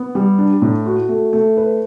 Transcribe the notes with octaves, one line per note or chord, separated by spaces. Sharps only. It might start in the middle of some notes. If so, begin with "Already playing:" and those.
Already playing: B3
G3
D4
A2
F#4
A3
A3
B4